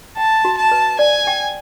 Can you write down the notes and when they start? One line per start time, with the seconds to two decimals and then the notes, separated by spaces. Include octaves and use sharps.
0.17 G5 A5
0.45 F#4
0.58 A5
0.71 B4
0.99 D5 G#5
1.27 G5